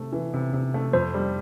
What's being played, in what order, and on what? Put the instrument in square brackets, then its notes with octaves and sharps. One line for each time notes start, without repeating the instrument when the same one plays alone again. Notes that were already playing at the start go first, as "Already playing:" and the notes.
Already playing: [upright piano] C3 A3
E3
C3
C3
A3
[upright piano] F2 [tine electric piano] C5
[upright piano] G3